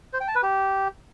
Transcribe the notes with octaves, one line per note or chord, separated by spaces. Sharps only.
C5
G5
A5
B4
G4